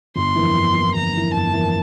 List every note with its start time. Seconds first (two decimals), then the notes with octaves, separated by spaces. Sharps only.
0.16 G1 C6
0.35 F2 E3 A#3 E4
0.56 G1
0.75 F2 E3 A#3 E4
0.94 G1 A#5
1.14 F2 E3 A#3 E4
1.34 G1 A5
1.53 F2 E3 A#3 E4